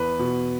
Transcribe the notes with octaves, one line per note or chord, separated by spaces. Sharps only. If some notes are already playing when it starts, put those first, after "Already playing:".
Already playing: E2 B4
B2